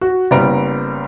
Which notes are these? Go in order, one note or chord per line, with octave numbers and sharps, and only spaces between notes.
F#4
F#1 G3 B3 C5 A#5 D7